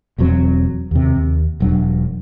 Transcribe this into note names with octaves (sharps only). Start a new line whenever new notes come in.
E1 E2 F#3 C4
D#2 C3
D#2
E1 F#3 D4